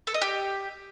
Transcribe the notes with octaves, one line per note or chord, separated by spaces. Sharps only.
A4
D#5
G4